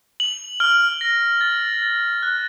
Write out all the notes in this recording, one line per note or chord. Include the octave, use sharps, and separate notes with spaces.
F#7
F6
A#6
A6
A6
F#6